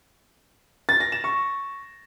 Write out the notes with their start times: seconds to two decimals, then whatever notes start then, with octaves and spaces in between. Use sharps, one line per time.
0.89 A6
1.00 A#6
1.12 E7
1.24 C#6